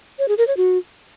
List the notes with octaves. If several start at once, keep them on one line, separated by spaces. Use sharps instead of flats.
C#5
G#4
A#4
C#5
F#4